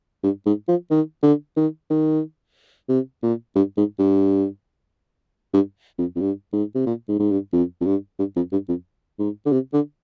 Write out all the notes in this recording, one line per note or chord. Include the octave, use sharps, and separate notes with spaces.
G2
G#2
F3
D#3
D3
D#3
D#3
C3
A#2
G2
G#2
G2
G2
F2
F2
G2
G#2
C3
A#2
G#2
G#2
G2
F2
F2
G2
G2
F2
G2
F2
G#2
D3
C3
D3